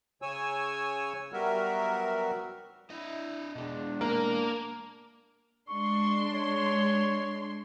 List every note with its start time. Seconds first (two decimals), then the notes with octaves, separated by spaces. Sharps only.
0.22 C#3 C#5 G#5 E6
1.33 F#3 G3 B3 F#4 A#4 E5
2.90 D4 E4 D#5
3.55 B2 G#3 D4
4.01 A#3 A#4
5.70 G#3 D4 C6 C#6
6.32 C#5